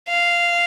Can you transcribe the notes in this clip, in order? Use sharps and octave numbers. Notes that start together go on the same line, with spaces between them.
F5